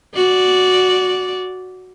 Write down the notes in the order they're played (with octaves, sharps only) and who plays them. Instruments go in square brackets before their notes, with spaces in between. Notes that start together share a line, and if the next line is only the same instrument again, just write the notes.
[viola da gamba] F#4 D5